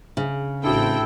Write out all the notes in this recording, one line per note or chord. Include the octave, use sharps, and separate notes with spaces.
C#3
A1 C4 D4 E4 F#4 A4 G5